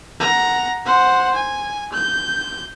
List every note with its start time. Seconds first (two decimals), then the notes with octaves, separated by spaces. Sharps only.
0.20 F#5 A#5
0.86 C5 F#5
1.35 G#5
1.93 G6